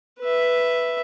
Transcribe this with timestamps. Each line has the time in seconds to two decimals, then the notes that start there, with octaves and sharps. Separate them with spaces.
0.20 B4 E5